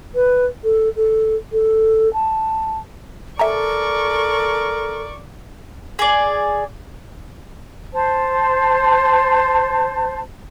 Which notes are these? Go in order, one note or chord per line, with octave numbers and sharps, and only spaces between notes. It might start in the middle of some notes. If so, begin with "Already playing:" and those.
B4
A4
A4
A4
A5
A4 A#4 D5 E5 G#5 A#5 C#6
G#4 D5
C5 A5